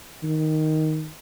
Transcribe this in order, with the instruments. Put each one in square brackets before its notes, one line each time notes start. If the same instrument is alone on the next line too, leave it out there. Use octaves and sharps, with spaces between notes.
[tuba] D#3